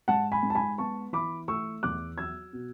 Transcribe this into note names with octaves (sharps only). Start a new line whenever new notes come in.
G#2 F#5 A5
G#5 B5
G#2
A5
G#5 B5
B3 A5 C#6
E3 B5 D6
A3 C#6 E6
E2 D6 F#6
F#3 E6 G#6
B2